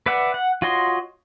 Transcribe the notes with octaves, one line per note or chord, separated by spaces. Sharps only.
B4 D5 E5 F#5
F#5
F4 F#4 C#5 D#5 C6